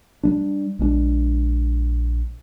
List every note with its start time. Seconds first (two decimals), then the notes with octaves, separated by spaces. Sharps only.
0.23 G3 G#3 D4
0.79 A#1 G#3 C#4 D4